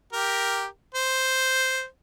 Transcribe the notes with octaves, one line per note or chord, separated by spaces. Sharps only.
G4 A#4
C5